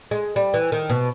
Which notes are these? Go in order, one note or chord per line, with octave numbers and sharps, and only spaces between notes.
G#3
G3
E3
D#3
B2